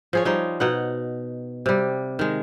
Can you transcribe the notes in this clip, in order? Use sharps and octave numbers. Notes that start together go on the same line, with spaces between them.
F3 G#4 C#5
F3 G3 D#4
B2 D#4 F#5
C3 G3
D#3 G#3